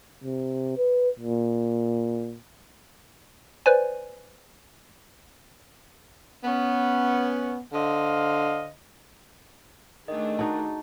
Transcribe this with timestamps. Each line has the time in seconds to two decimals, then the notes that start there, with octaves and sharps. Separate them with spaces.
0.24 C3
0.77 B4
1.19 A#2
3.66 B4 C5 D5 G#5
6.44 B3 C#4
7.73 D3 C5 D#5 F5
10.08 D#3 A3 D4 G#4 D#5
10.39 D#4 F#4 A5